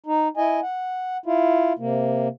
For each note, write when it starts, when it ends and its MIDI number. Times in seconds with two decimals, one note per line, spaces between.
0.06 0.28 63
0.37 0.60 64
0.37 0.60 75
0.37 0.60 80
0.62 1.17 78
1.26 1.73 64
1.26 1.73 65
1.79 2.28 48
1.79 2.28 58